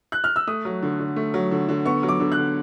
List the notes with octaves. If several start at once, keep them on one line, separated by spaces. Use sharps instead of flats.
F#6
F6
E6
A3 D#6
F#3
D3
D3
A3
F#3
D3
D3
B3 C#6
F#3
D6
D3
F#6
D3